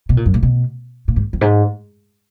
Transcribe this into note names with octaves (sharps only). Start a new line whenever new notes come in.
B2
A#2
F#2
A#2
B2
A#2
G#2
F2
G#2